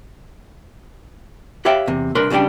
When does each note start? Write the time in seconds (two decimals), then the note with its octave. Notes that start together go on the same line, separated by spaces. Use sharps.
1.65 G4 B4 C#5 E5 F5 G5
1.88 E2 C3
2.15 C2 D4 A#4 B4 C6
2.30 C#2 C#3 G3 D4 G5